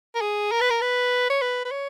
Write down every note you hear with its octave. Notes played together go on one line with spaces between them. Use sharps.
A#4
G#4
A#4
B4
A#4
B4
C#5
B4
B4
C#5